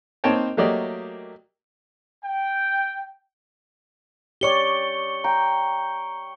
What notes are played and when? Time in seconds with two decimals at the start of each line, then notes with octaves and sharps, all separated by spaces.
0.24 A#3 C4 D#4 C#5 G5 A5
0.57 F#3 A3 A#3 G4 D5 D#5
2.23 G5
4.41 G4 C#5 D5 C#6 C#7 G7
5.24 G5 A#5